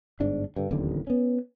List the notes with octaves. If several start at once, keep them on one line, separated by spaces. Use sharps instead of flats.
G1 G#2 D4
G2 D3
D1 A1 D#2 D3
B3 C#4